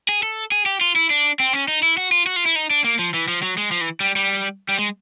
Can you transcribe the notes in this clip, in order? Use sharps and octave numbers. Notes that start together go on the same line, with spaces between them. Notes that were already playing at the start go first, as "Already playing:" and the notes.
G#4
A4
G#4
G4
F4
E4
D4
C4
C#4
D#4
E4
F#4
F4
F#4
F4
E4
D#4
D4
A#3
F3
E3
F3
F#3
G#3
F3
E3
G3
G3
G3
G#3